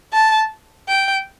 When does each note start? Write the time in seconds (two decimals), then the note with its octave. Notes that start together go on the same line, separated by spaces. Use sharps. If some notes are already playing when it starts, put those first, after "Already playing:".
0.13 A5
0.88 G5